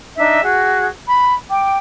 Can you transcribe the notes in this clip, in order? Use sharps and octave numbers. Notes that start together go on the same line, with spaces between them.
D4 D#4 E5
F#4 G#4
B5
G5 D6